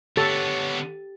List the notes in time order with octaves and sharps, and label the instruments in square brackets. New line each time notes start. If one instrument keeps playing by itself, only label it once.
[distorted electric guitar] D3 B3 [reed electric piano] G4 A6 [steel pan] A4 [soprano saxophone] C#5